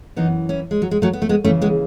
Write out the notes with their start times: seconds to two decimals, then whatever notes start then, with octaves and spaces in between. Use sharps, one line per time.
0.16 F#2 E3 B3 D#4
0.49 C#4 E4
0.71 G#3
0.82 F#3
0.91 G#3
1.02 F#3 A3
1.13 B3
1.22 A3
1.29 G#3 B3
1.44 D#2 C#3 E3 A3 C#4
1.62 G#3 B3